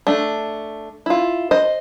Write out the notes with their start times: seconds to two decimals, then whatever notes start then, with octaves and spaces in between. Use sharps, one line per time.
0.07 A3 D4
1.06 E4 F4
1.51 C5 D#5